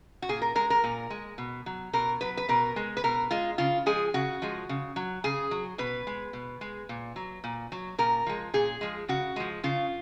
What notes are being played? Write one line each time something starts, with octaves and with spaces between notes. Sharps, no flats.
F#4
A#2 G#4
A#4
G#3 A#4
A#4
A#2
G#3
B2
F#3
B2 A#4
F#3 B4
B4
B2 A#4
G#3
B4
B2 A#4
G#3 F4
C#3 F4
F3 G#3 G#4
C#3 F#4
F3 G#3
C#3
F#3
C#3 G#4
F#3
B2 B4
G#3
B2
G#3
A#2
F#3
A#2
F#3
A#2 A#4
F3 G#3
A#2 G#4
F3 G#3
C#3 F#4
F3 G#3
C#3 F4